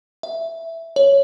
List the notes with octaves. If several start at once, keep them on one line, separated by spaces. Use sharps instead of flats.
E5
C#5